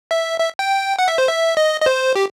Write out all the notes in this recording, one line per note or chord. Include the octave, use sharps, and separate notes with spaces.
E5
E5
G5
F#5
E5
C5
E5
D#5
D#5
C5
G4